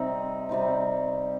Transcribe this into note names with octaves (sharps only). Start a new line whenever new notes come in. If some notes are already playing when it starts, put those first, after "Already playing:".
Already playing: C3 G3 C4 D#4
C3 G3 C4 D#4